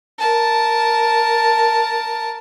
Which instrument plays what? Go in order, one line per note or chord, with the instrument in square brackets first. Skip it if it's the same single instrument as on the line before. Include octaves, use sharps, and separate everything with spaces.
[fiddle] A#4 A5